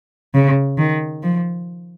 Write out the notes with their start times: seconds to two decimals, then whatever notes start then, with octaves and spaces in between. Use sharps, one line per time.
0.34 C#3
0.78 D#3
1.23 F3